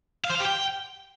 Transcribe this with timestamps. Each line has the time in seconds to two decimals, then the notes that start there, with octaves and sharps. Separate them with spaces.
0.25 F5
0.30 C5
0.35 F5
0.40 G4
0.45 G5